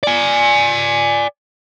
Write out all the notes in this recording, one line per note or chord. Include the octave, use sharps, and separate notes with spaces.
D5 G#5